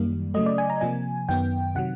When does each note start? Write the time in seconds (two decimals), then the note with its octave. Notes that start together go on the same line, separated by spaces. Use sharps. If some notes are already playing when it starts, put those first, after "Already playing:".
Already playing: F#2 D#3 G3 A#3
0.34 C#3 F#3 A3 D#5
0.46 D5
0.58 G#5
0.70 A#5
0.81 C3 F3 A#3 G#5
1.29 F#2 D#3 F#3 B3 G5
1.75 C3 D#3 F#3 F#5